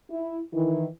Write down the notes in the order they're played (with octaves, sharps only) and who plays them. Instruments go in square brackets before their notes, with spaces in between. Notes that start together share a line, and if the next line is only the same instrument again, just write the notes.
[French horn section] E4
D#3 E3 E4